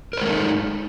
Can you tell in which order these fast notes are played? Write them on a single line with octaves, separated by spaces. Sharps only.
A#4 C5 G#3 A4 D#4